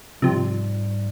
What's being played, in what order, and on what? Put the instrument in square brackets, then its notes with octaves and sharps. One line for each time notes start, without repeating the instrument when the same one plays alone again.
[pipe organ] G#2 G3 [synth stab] C3 F3